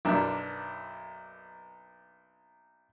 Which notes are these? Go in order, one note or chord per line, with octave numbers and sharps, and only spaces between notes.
B1 F#2 A#3 D4